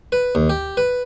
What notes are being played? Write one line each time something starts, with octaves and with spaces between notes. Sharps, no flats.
B4
D#2
G4
B4